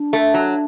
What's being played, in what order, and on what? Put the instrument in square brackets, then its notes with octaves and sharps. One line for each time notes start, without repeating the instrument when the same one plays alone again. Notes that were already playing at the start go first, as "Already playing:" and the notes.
Already playing: [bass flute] D4
[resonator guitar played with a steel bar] A3
F#3